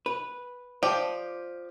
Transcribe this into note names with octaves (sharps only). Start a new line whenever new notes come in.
B4
F3 G4 D5